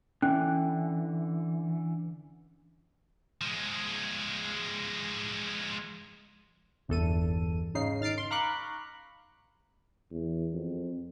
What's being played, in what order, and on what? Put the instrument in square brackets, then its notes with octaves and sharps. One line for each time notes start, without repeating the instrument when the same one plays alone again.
[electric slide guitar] D3 E3 [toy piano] C#4
[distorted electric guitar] F3 G#3
[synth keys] G1 E2 A4 D#7
G#2 C#3 D#4 C7
D#3 F6 A6 C7 D7
C6
F5 A#5 B5 C#6 D6 F#6
[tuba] E2
F2